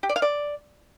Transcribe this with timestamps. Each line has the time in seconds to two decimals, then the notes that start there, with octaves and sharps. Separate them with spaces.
0.03 G4
0.09 D5
0.16 F5
0.22 D5